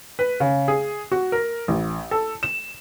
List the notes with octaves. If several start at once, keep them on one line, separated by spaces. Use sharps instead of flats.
B4
C#3
G#4
F#4
A#4
A1
A4
E7